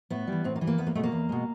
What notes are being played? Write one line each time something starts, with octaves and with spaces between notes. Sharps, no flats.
A2 B3
E3 G3
A2 C4
A#3
E3 G3
A#3
E2 B3
A#3
B2 G#3 A3
A#3
E2
B2 G#3